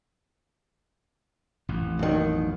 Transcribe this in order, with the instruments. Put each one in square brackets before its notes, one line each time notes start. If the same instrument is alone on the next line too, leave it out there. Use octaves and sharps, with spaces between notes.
[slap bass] A1 F2
[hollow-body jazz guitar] B1 D#3